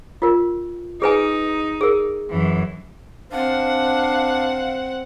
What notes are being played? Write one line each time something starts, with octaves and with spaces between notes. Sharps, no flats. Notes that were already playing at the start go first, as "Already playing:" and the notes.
F4 A#4
D#4 G#4 B4 G#5
G#4 A#4
F#2 E3
C4 D4 F5 F#5